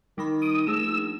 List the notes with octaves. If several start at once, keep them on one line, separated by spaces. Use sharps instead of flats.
D#3 G3 D#4 B5
D#6 D7
G#2 A3 D#4 E6
A#1